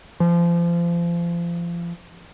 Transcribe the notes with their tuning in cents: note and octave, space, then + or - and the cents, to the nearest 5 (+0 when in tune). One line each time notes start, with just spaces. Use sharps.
F3 -30